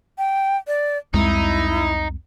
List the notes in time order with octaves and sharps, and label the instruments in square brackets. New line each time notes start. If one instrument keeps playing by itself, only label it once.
[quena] G5
D5
[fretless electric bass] C2 F2 G#3 [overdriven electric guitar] D#4 [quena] E4